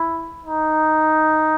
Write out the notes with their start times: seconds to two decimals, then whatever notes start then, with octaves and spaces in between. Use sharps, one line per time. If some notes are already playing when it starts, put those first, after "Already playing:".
Already playing: E4
0.44 D#4